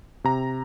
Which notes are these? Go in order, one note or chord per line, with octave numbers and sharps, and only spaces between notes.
C3 A#5